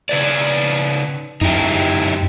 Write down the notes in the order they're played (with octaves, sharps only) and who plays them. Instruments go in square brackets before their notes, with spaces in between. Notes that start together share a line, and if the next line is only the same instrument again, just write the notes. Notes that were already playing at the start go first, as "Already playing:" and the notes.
[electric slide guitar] C#3 B4 D5
[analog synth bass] F#2 [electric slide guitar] D#4 E4 G4